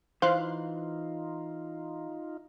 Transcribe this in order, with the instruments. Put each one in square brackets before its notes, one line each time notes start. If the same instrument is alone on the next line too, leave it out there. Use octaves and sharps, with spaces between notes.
[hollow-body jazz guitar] E3 [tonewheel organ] D#4 F4 [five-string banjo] C5 [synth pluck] F5 C6 F#6